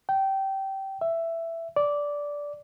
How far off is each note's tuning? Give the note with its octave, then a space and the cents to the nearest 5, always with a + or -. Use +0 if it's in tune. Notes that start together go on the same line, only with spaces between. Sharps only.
G5 -20
E5 +10
D5 -10